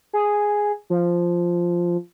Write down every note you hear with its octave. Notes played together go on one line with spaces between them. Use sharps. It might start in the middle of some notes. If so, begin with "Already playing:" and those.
G#4
F3